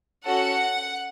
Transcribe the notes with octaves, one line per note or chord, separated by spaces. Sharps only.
C#4 F#4 A4 F#5